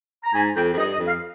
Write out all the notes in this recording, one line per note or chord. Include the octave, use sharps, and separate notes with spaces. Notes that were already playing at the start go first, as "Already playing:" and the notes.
A#5
G#2 G#5
F2 G5
F2
G2 D#5
D#5
F2
F5